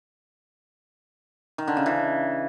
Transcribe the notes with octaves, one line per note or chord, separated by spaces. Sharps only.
D#3
D3
C#3
E3